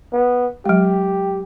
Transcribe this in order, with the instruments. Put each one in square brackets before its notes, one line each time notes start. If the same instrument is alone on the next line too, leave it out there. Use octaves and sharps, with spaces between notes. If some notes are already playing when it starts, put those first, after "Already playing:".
[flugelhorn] B3
[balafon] F#3 G#3 [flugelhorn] G4